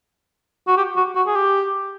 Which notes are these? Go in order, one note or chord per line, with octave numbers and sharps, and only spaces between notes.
F#4
G4
F#4
F#4
G#4
G4